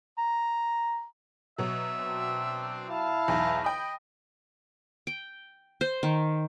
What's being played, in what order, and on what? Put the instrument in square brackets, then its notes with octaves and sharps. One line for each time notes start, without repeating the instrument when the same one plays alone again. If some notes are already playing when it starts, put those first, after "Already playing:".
[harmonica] A#5
[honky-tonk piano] B2 F#3 [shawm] E5
[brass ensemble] C4 D4
[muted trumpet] E4 [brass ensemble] F5 A5
[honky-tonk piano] B1 E2 [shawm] A#5
[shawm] D#5 [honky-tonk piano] G5 B5
[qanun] G5
C5
D#3